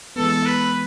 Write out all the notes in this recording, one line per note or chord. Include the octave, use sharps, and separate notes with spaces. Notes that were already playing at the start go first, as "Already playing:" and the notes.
E3 G#3 B3 A4
B4